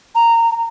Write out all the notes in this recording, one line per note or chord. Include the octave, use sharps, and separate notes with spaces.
A#5